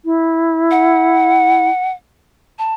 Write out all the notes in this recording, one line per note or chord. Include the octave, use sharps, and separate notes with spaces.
E4
F#5
A5